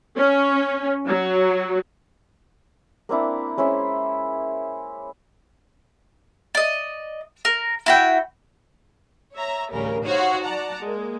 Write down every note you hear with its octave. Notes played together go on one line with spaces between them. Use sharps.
C#4
F#3
A#3 C4 D4 E4
G#3 C#4 E4 C5
D5 D#5
A#4
E4 F#4 G5
C#5 E5 A#5
A1 D2 C#3 G3 A#4
D#4 F#4 C5 C#5 F5 F#5
D5 F#5 A5 A#5
G#3 A#3